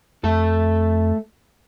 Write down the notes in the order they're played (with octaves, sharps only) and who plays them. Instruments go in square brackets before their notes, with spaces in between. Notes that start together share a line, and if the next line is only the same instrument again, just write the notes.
[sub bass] F2 [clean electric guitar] A3 A4